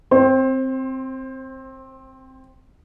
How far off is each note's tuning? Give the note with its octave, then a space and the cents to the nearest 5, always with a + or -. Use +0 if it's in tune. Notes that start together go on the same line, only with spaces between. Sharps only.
C4 +0 C5 +25